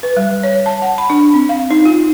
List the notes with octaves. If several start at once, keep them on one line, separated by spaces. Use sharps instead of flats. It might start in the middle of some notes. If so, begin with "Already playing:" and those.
B4
G3
C#5
A5
F#5
B5
D4
C4
F5
D#4
F4